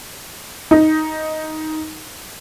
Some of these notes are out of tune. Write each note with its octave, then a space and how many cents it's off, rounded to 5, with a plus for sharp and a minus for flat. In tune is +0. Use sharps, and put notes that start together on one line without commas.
D#4 +5